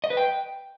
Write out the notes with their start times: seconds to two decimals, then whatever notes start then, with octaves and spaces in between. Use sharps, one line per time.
0.04 D#5
0.10 B4
0.17 G5